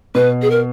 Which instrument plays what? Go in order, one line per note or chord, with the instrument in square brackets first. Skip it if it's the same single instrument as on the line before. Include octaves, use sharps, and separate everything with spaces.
[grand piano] B2 [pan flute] B4
[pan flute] G#4
A#4